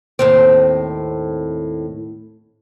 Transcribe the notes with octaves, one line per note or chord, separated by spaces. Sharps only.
D#2 A2 C4